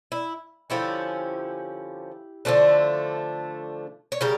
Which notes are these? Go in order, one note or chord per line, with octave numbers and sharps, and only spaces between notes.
E4
D3 F3 C#4 E4 G4
D3 F3 A3 D4
C#5
C#3 G3 G4 A#4